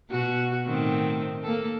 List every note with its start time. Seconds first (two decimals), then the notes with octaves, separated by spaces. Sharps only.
0.10 B2 F#4
0.67 A2 D#3 C4
1.43 A#3 A4